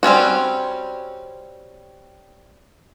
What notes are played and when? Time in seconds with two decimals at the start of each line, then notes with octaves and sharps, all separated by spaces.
0.03 G3 C4 C#4 F#4